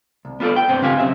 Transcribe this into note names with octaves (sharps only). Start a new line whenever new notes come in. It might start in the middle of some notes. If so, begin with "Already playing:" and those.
C2
B3 F4 F#4 A4 D5
G5
C2 G2 B3 C4 C5
C#3 C4 F4 G4 F5 G#5
B1 C#3 C4 E5